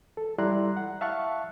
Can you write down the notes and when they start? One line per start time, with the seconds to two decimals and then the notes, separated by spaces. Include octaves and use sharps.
0.17 A4
0.38 G3 E4 D5 A#5 C6 F#6
0.77 F#5
1.01 E5 F5 A5 C#6 F#6